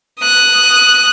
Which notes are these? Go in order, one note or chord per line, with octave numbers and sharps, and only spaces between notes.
D#6 F#6